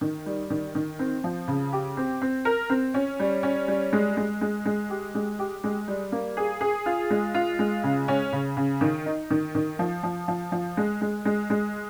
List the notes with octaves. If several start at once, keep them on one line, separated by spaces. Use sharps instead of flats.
D#3
G3
D#3
D#3
C4
F3
C#3
G4
C4
C4
A#4
C4
C#4
G3
C#4
G3
G#3
G#3
G#3
G#3
G4
G#3
G4
G#3
G3
A#3
G#4
G#4
F4
G#3
F4
G#3
C#3
C#4
C#3
C#3
D#3
D#4
D#3
D#3
F3
F3
F3
F3
G#3
G#3
G#3
G#3